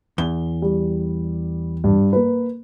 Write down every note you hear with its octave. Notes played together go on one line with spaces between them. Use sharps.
E2 G7
G3
G2
A#3 B4